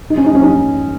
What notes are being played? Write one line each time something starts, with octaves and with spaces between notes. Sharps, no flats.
D#4
C#4
D#4
C#4
D#4